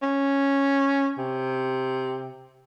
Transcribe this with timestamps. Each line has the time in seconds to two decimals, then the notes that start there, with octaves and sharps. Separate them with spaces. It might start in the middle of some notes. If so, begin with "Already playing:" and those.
0.02 C#4
1.18 C3